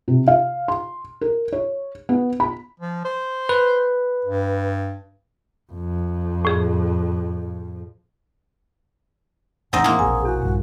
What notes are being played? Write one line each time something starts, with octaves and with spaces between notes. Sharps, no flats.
C3
F5
C6
A#4
C#5
B3
B5
F3
C5
B4
G2
F2
A2 G#4
E2 A2 C4 D#4 D#5 F#5 G#5
G#3 A#3 E4
E1 A#1 G#4 G#5
E2 F#4
A#1 G2